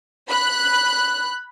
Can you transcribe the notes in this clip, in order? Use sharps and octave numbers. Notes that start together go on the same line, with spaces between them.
B5 F#6